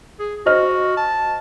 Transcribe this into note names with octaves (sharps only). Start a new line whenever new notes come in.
G#4
F#4 C5 D#5 F6
A5